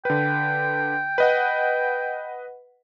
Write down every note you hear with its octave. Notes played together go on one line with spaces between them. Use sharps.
D3 B4 G5
B4 D#5 F#5